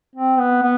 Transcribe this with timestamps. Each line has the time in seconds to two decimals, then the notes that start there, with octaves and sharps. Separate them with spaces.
0.16 C4
0.39 B3
0.62 B3